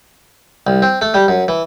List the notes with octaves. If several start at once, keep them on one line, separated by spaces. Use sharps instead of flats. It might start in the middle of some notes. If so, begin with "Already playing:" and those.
C2
C4
A3
G3
F#2
E3